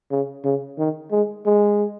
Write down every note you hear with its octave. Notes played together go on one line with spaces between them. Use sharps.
C#3
C#3
D#3
G#3
G#3